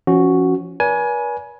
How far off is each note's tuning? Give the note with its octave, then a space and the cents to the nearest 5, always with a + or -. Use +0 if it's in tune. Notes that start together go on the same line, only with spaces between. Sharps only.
F3 -35 C#4 +0 F#4 +0
B4 -40 D5 -40 G#5 +15